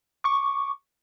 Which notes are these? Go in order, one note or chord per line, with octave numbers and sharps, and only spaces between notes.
C#6 D6